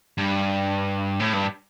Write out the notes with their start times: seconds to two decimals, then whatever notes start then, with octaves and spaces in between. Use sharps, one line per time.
0.18 G2
1.20 A2
1.33 G2